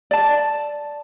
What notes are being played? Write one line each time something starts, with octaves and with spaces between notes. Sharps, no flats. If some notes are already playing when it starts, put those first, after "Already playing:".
D5 A5